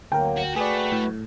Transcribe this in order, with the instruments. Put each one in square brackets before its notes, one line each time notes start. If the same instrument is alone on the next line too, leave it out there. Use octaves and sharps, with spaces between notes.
[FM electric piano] D2 A#4 [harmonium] F#3 A#3 [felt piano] G5
[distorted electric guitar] F#4
[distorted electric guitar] A3 [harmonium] F#4 B4 [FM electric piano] G#4 D5
[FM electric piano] A2